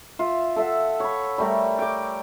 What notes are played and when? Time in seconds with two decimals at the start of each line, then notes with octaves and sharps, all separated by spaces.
0.19 F4 E5
0.56 A4 E5 F#5
1.00 C#5 B5
1.38 G3 A3 A#4
1.79 G5 D6